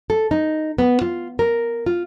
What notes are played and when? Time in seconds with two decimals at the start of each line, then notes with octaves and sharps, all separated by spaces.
0.10 A4
0.31 D#4
0.78 B3
1.02 F4
1.39 A#4
1.86 F4